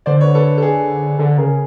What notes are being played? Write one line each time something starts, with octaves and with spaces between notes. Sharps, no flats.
D3 C5 D5
B4 C#5
A4 B4
A4
G#4
D3 A4
C#3 G#4 A#4